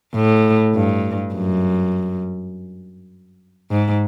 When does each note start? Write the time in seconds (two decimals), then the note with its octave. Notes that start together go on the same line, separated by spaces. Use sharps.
0.15 A2
0.74 G2
1.34 F#2
3.71 G#2